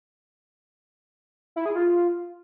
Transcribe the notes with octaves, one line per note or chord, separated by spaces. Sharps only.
E4
G#4
F4